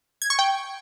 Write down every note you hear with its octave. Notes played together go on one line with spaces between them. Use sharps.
G#6
C#6
G5